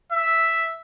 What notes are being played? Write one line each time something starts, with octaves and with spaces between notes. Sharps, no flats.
E5